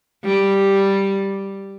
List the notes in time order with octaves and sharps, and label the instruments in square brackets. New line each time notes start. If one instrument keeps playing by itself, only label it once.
[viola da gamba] G3